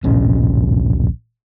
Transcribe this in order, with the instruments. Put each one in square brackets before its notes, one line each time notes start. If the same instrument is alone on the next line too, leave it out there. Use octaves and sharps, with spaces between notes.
[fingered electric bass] D1 A#1 C#4